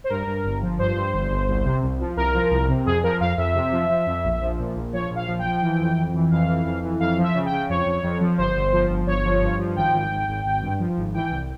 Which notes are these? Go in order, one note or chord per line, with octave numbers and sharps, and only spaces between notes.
C5
G2 A#4
G2
G1
F3
G2 C5
G2
G1
G1
C2
C3
C2
F3
C2 A#4
F3
C2
C3
F2 G#4
F3 A#4
F2 F5
F2 E5
C3
F3
F3
F2
A#1
F3
A#2
A#1
F3 C#5
A#1
F5
F3
G5
F3
E3
F2
F2
E3
F2 F5
E3
F2
E3
F2 F5
F3
E5
C#3
G5
C#3
F2 C#5
F2
F2
F3
G1 C5
G1
F3
G1
G1 C#5
F3
G2
F3
G#1 G5
G#1
G#1
G#1
G#1
G2
F3
G#1
E3 G5
C2